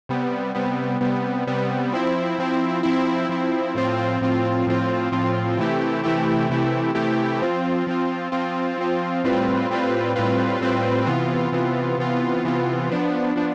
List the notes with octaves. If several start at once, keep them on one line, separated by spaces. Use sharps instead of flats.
C3 G3 B3
C3 G3 B3
C3 G3 B3
C3 G3 B3
F3 C4 E4
F3 C4 E4
F3 C4 E4
F3 C4 E4
A2 F3 C4 F4
A2 F3 C4 F4
A2 F3 C4 F4
A2 F3 C4 F4
C3 E3 A3 E4 G4
C3 E3 A3 E4 G4
C3 E3 A3 E4 G4
C3 E3 A3 E4 G4
F3 C4 F4
F3 C4 F4
F3 C4 F4
F3 C4 F4
A2 G3 C4 F4 B4
A2 G3 C4 F4 B4
A2 G3 C4 F4 B4
A2 G3 C4 F4 B4
C3 E3 B3 F4
C3 E3 B3 F4
C3 E3 B3 F4
C3 E3 B3 F4
F3 B3 D4
F3 B3 D4